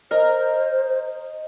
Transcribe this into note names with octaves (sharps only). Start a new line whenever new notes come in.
A#4 C5 D#5